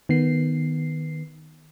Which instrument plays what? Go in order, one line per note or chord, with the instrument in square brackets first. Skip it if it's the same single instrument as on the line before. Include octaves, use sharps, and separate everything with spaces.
[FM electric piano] D#3 B3 C7